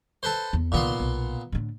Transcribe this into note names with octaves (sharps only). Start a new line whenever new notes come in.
A4 B4 C5
E2
C2 A#2 D#3 B3 C6
B1
A2 D3